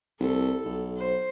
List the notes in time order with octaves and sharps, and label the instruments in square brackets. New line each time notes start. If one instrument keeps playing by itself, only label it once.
[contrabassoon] C2 [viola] A4
[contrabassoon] B1
[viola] C5